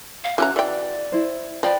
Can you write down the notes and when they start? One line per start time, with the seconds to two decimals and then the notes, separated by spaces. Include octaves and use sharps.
0.24 F5
0.38 E3 C#4 F#4 A#5 F#6
0.56 E3 D5 G5
1.12 E4 C5
1.63 F3 B4 D5 G5 B5